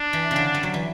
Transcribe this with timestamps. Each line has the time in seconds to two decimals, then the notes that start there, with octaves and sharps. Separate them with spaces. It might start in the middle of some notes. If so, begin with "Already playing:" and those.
Already playing: D4
0.13 E3
0.31 C#3
0.36 D3
0.54 G3
0.63 F#3
0.74 E3